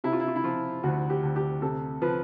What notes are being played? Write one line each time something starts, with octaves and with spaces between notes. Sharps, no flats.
C3 E4
F4
E4
F4
E4
F3 F4
D2 F#4
G4
D2
G4
C3 A4
F3 B4